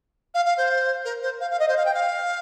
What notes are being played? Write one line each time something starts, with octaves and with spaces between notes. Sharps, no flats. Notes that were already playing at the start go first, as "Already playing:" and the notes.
F5
F5
C5
A#4
C5
F5
F5
D#5
C5
F5
G5
F5